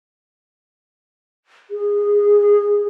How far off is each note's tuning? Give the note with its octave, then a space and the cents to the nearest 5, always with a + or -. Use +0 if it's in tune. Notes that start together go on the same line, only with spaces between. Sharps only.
G#4 -15